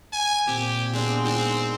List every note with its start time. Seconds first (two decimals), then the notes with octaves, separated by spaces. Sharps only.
0.13 G#5
0.47 A#2 C4 G4
0.93 G#3 B3 C4 D4
1.25 G#3 C4 D#4 D5